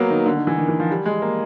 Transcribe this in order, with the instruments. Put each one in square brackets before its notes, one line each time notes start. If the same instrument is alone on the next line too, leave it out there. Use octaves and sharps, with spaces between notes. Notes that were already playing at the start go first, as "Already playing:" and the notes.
Already playing: [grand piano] F#3 A#3 B3
D#3
D3
D#3
E3
D#3
E3
F3
G3
G#3
A#3